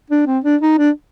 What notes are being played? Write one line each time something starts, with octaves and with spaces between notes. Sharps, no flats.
D4
C4
D4
D#4
D4